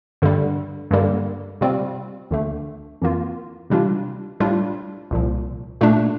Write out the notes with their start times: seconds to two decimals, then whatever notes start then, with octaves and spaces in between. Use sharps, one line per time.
0.22 G2 D3 G3
0.91 G2 D3 G3 A#3
1.61 C3 G3 C4 F4
2.31 D2 D3 A3
3.02 F2 E3 A#3 F4
3.70 C3 E3 G3 D4 F4
4.40 A2 G3 D4 F4
5.11 C2 A#2 F3
5.81 A#2 A3 D4